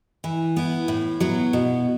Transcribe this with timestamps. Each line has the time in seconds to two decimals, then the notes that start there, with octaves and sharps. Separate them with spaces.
0.24 E3
0.56 B3 E4
0.88 A2
1.20 F#3 B3
1.53 B2